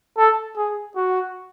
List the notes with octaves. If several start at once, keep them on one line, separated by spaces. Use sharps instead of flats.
A4
G#4
F#4